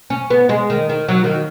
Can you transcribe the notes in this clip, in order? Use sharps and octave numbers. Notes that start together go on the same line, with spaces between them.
C#4
B3
G#3
D#3
D#3
F#3
D#3